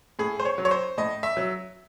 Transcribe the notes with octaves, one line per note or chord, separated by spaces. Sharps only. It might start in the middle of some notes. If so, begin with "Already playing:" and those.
A2 G#4
C5
C#5
F#3
C#5
C5
A2 D#5
E5
F#3